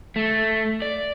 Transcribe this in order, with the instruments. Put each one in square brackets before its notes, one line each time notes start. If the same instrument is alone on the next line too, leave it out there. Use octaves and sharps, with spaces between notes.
[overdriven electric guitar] A3
D5